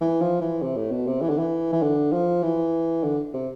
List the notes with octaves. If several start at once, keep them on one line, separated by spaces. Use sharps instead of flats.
E3
F3
E3
C3
A2
B2
C3
E3
D3
E3
E3
D3
F3
E3
D3
C3